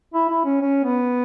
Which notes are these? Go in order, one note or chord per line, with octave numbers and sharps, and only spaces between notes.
E4
E4
C#4
C#4
B3